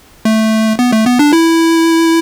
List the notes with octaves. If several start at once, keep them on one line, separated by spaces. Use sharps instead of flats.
A3
B3
A3
B3
D4
E4